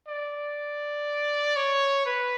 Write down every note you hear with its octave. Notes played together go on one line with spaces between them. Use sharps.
D5
C#5
B4